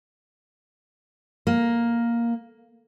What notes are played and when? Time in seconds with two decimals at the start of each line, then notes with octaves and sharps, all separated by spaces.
1.47 A#3